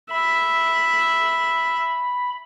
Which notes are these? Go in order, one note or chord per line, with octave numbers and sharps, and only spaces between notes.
E5 B5